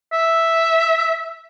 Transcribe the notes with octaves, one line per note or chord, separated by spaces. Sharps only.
E5